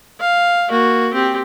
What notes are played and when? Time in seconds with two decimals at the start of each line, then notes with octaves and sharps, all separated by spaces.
0.20 F5
0.69 A#3 F#4
1.13 C4 G4